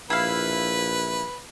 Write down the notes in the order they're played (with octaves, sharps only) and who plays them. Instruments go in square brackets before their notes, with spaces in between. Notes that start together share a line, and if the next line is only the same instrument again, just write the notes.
[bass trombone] A#1 [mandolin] E4 F5 [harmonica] B4